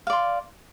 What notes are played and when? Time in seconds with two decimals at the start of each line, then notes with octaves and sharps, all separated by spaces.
0.07 F5
0.10 D5
0.13 C6